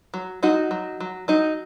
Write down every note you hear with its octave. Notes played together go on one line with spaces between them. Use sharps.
F#3
F#3 D#4 F#4
F#3
F#3
F#3 D#4